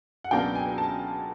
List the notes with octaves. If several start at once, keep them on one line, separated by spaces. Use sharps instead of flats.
F#5
C#2 B2 F#3 A#3 D4 G5
G#5
A5